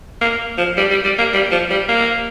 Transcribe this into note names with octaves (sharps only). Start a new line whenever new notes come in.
A#3
F3
G3
G3
G3
A#3
G3
F3
G3
A#3